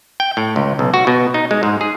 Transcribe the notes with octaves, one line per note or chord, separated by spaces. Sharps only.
G5
A2
C#2
B1
F#4
B2
D#4
G#3
G#2
G#4